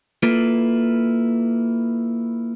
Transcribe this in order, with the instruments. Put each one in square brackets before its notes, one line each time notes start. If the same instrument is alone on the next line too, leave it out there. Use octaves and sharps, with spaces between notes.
[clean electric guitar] A#3 E4 F4 A4 B4